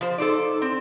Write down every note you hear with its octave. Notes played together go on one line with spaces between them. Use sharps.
F3 C5
D#4 A4 C5 D5
C4